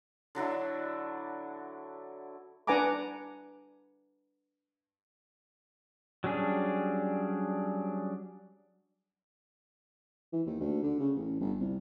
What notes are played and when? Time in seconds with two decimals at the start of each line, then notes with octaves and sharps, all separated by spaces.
0.35 D3 F#3 D4 E4
2.67 D4 B4 F#5 G#5 A#5 D6
6.24 F#3 G3 C#4 D4 G#4
10.33 E3
10.47 D#2
10.61 D2
10.83 D3
11.00 C#3
11.16 A1
11.40 G1
11.59 C2